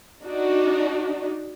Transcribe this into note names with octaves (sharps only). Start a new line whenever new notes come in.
D4 D#4 F#4